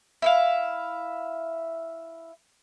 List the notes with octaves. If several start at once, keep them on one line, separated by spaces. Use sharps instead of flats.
E4 E5 F5